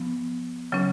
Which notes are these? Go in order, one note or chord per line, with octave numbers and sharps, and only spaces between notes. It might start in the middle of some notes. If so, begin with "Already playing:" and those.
Already playing: F3 B3
C#3 F#3 C#4